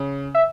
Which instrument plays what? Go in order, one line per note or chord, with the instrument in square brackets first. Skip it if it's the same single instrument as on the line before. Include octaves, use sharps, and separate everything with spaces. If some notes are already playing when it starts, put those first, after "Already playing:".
Already playing: [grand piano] C#3
[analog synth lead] E5